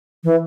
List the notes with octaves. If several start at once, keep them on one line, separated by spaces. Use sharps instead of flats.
E3